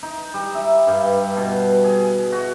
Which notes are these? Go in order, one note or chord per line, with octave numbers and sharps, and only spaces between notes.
D#4
G3
E5
G2
B2
G#4
F#4